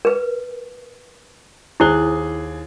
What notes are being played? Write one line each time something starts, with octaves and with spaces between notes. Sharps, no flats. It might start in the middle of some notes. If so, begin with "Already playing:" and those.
A#4 B4
D#2 E4 G#4 C5 G7